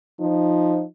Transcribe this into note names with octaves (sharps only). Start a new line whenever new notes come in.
F3 D#4